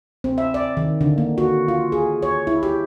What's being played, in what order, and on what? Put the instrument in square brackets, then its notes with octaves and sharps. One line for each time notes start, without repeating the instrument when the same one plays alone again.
[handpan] C4
E5
D5
D#3
D3
A#3
F#4
F4
G#4
C#5
E4
G4